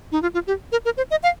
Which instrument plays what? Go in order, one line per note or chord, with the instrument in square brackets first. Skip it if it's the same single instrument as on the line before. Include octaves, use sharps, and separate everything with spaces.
[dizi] D#4
F4
F4
G4
A#4
A#4
C5
D#5
F5